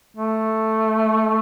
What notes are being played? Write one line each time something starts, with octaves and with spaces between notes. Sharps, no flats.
A3